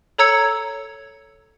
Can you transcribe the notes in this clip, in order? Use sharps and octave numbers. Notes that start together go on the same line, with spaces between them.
A4 C#5 A#5 E6 G#6 C#7